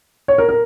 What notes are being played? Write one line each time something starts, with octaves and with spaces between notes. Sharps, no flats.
C#5
A#4
A#4